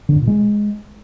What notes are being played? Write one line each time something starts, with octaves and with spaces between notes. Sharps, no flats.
D3
F#2
A#2
G#3